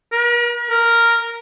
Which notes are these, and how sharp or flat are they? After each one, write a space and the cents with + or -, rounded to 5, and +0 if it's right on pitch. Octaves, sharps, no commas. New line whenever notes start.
A#4 +45
A#4 -5